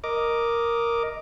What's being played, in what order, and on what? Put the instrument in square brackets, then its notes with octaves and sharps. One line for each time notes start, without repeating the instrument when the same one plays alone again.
[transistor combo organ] A#4 D#5 D6